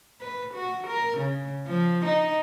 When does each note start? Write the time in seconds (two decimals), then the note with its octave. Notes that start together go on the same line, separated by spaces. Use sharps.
0.21 B4
0.54 F#4
0.87 A#4
1.18 C#3
1.66 F3
2.06 D#4